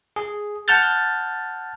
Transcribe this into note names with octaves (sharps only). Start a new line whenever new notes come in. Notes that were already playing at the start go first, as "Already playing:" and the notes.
G#4
F#5 A5 F6 G6 A6